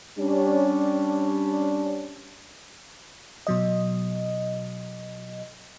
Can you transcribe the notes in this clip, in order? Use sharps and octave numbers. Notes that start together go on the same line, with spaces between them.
G3 C#4 D4
B2 F#3 D#5